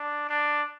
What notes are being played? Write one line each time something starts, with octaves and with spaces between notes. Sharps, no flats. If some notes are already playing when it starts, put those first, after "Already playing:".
Already playing: D4
D4